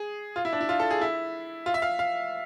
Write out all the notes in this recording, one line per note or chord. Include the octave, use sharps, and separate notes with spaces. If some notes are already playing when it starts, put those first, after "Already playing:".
Already playing: G#4
F4
E4
D4
E4
F4
A4
G#4
E4
F4
E5
F5
F5